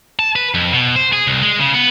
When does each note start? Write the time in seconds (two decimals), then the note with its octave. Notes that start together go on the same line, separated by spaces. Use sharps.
0.19 A5
0.36 B4
0.54 F2
0.73 B2
0.96 C5
1.13 G#4
1.27 C2
1.42 G#3
1.60 C#3
1.74 B3